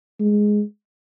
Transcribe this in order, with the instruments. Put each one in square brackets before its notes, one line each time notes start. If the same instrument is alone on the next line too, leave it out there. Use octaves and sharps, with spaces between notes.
[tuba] G#3